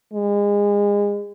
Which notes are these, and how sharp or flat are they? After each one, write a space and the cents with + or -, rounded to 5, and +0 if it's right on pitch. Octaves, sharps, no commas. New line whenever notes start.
G#3 -30